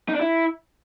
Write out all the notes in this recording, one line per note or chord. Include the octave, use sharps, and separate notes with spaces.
D#4
D4
E4